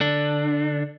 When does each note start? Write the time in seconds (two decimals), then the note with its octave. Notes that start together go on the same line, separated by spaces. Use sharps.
0.01 D3 D4